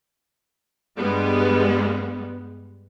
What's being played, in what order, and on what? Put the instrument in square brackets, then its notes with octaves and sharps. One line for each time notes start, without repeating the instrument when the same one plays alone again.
[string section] G2 G3 G#3 B3